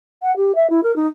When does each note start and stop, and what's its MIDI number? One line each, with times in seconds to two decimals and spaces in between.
0.22 0.35 78
0.37 0.55 67
0.55 0.70 76
0.70 0.81 64
0.83 0.94 70
0.96 1.07 63